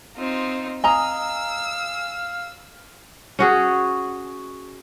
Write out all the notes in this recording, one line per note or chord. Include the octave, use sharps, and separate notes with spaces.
C4 D#4 F4
D#5 F5 G#5 A#5 D#6 E6
C#4 F#4 G#4